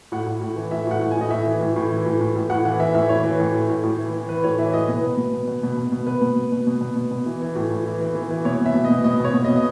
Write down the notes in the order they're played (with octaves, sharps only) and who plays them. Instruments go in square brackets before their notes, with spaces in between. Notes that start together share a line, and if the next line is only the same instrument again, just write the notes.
[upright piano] A2 F#5
A2
A2
E3
A2 E5
A2 F#5
A2
G#5
A2 D#5
A2 E5
E3
A2
A2
E3
A2
A2
A2
A2 F#5
E3 F#5
E3 E5
A2 E5
E3 C#5
E3
A2
A2
A2
A2
E3
E3
E3 B4
A2 C#5
E3 E5
A2 D#5
B2 B4
B2
B2
B2
B2
B2
B2
B2
B2 B4
B2
B2
B2
B2
B2
B2
B2
E3
E3
A2
A2
E3
E3
E3
E3
B2 C#5
B2
E5
B2
D#5
B2
B2 D#5
B2 C#5
B2
D#5
B2
D#5